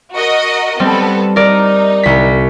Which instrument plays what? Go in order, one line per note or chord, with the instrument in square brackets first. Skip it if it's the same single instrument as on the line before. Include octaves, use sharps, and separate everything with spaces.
[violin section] F#4 A#4 D#5
[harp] G3 C4 [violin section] B3 A4
[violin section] D#4 [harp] A#4 D5
[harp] C2 B6